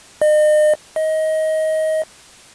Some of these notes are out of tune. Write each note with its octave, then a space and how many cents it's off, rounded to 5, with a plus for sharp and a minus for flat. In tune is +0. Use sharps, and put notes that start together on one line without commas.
D#5 -40
D#5 +20